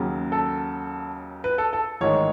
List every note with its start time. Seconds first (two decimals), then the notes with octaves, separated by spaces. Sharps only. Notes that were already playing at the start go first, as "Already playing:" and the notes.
Already playing: D#2 C#3 F#3
0.32 A4
1.44 B4
1.58 A4
1.73 A4
2.01 A1 G#2 D#3 G#3 C#5